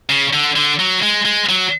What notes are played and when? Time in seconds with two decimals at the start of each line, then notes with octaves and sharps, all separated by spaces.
0.09 C#3
0.33 D3
0.56 D3
0.79 F#3
1.03 G#3
1.25 G#3
1.49 F#3